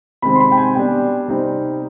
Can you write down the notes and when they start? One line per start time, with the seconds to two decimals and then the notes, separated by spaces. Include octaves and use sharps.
0.22 C3 D#3 G#3 C4 B5
0.36 C6
0.40 B5
0.52 G5
0.57 G#5
0.75 B2 G3 D4 G5
1.28 C3 G3 C4 D#4